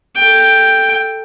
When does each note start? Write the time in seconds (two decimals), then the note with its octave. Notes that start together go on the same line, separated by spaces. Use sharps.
0.16 A4 G5